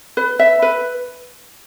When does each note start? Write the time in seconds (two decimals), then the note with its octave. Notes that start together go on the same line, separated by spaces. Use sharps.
0.17 B4
0.39 E5
0.62 B4